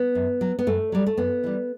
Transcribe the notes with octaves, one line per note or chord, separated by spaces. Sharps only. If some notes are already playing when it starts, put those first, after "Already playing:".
Already playing: B3
F#2
F#3
B3
F#2 A3
F#3 G3
A3
F#2 B3
E3 G3